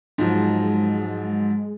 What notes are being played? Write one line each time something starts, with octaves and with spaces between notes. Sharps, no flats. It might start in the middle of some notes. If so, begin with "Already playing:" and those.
G#2 F3 F#3 G#3